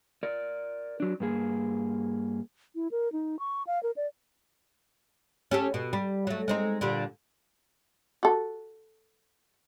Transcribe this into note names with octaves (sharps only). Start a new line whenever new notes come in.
A#4 D5
F#3 D4
G2 A#3 G#4
E4
A#4
D#4
C#6
F5
A#4
D5
C#4 G4 A4
B2
G3
F#3 A3
G#3 C4 D#4
A#2 D3 G3
F#4 A4